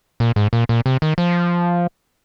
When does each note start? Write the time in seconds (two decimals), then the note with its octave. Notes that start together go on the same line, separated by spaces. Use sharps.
0.20 A#2
0.36 G#2
0.53 A#2
0.69 A#2
0.86 C3
1.02 D#3
1.18 F3